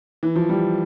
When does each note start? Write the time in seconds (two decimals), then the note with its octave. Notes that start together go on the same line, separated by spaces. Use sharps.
0.23 E3
0.36 F3
0.49 G3